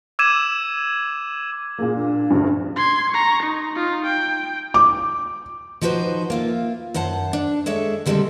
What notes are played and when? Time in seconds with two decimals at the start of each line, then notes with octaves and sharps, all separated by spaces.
0.19 D6 E6 G#6 D#7 E7
1.79 A#2 A#3 G#4
1.96 D4
2.30 F1 D2 G2
2.76 C6 G#6
3.11 A#5 C#6
3.43 D#4
3.74 D#4 F4
4.07 G5
4.74 D6
5.81 F3 D#4 F#4 B4 C5
6.30 A#3 F4 E5
6.94 F#2 C5 F#5 A5
7.33 D4
7.66 G#3 A4 C#5 E5
8.06 D3 G3 G#3 A#3 C4 A4